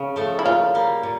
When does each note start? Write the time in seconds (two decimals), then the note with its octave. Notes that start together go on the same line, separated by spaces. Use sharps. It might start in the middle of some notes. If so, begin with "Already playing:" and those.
Already playing: C#3
0.16 F3 A3
0.39 E4
0.45 A#2 F4
0.75 G3 A#3
1.03 A#2